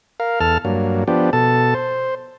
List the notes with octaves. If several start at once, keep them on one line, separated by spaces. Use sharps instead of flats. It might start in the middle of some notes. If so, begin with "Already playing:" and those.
A#4 F5
E2 A4 A5 F6
G2 F#3 A#3
F3 B3 D4 G4
B2 A4 A5
C5